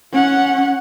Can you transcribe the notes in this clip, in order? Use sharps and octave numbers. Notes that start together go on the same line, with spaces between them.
C#4 F#5